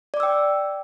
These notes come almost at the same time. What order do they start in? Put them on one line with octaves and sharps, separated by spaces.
D5 D6 E6 G5